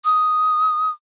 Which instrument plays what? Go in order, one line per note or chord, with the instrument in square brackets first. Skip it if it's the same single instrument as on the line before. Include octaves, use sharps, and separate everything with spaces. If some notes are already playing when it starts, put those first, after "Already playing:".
[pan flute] D#6